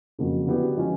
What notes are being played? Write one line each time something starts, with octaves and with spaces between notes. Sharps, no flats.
F2 C#3 F#3 A#3
D3 F#3 B3 E4 G4
F3 G#3 C#4